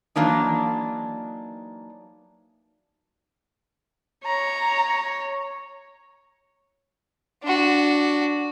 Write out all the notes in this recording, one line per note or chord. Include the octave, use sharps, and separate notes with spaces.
E3 F#3 A#3 D4 D#4
C#5 A#5
D4 F#4